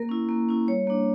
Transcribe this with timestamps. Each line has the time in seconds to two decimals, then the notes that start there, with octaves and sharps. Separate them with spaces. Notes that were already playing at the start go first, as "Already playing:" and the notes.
Already playing: A#3 A#4
0.09 C#4 E4
0.29 A#3
0.49 C#4 E4
0.68 G3 C#5
0.87 A#3 D4